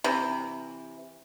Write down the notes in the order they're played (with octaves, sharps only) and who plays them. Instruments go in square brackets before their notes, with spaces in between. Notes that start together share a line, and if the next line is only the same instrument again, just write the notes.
[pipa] C3 E3